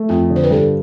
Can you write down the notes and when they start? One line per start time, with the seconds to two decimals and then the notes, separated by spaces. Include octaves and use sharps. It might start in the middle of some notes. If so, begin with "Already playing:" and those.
Already playing: A3
0.09 F2 F4
0.30 D3
0.36 C5
0.43 B4
0.51 G2 A4